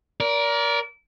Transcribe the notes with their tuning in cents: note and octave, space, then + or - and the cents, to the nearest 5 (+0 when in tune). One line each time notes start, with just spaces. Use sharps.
A#4 +20 D5 -30